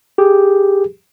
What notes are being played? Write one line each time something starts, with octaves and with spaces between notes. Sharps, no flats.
G4 G#4